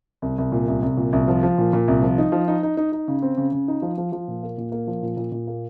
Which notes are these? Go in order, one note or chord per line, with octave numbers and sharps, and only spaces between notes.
C2
C2
A#2
C2
C2
A#2
C2
F3
F3
A#2
A#2
C2
F3
D#4
F3
D#4
D#4
D#4
D#4
C#3
C4
C#3
C#3
D#4
F3
F3
F3
A#2
A#3
A#2
A#3
F3
A#2
A#2
A#2
A#3